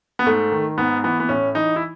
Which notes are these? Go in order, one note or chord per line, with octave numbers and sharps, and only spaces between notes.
B3
G#2 A3
D#3
G#2 B3
E3 B3
B3
A2 C#4
E3 D#4
E4